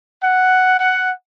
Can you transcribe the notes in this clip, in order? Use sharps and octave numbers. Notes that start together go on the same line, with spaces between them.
F#5
F#5